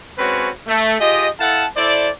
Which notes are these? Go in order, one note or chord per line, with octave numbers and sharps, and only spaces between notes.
G#3 C4 C#4 F#4 B4 C#5
A3
F4 G4 G#4 D#5
E4 A4 F5 F#5 A5
E4 A4 C5 D5